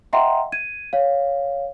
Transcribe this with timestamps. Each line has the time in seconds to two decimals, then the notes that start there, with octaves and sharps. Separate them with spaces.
0.13 D#5 E5 F#5 G5 A#5 C6
0.52 G#6 D#7
0.93 C#5 F5